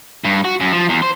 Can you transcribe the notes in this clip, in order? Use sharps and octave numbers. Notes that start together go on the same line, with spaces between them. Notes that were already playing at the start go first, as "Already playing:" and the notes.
G2
F#4
F#2
F3
E2
C5